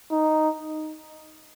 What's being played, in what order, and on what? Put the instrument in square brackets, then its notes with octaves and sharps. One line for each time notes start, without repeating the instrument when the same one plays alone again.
[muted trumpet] D#4